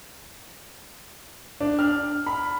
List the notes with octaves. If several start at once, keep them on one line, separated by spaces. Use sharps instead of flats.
D4
F6
B5